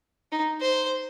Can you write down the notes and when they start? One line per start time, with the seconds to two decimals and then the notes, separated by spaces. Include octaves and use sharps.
0.32 D#4
0.61 C5